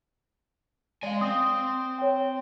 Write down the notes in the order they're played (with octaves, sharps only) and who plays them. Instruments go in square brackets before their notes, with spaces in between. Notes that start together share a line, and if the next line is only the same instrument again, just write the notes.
[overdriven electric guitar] G#3 G#5 [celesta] D5 F5
[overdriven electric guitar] C4 [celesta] D#6
[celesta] C#5 G5